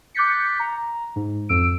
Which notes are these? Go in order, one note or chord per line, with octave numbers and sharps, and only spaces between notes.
D6 F#6 G6 A6 B6 C#7
A#5
G#2
F2 E6 D7